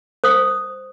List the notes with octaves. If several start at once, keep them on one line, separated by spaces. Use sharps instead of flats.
C5 D#6